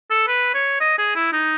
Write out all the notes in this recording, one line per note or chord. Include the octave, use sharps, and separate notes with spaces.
A4
B4
C#5
D#5
G#4
E4
D#4